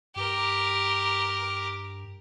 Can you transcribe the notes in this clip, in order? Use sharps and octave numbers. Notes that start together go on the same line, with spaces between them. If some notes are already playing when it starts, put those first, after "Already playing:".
G2 G4 A#4